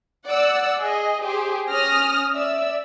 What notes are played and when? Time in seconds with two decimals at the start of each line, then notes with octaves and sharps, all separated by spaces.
0.27 D5 F#5 E6
0.80 G#4 D#5
1.23 G4 G#4 C5
1.70 C#4 D#6 F6 A#6
2.34 D5 E5 E6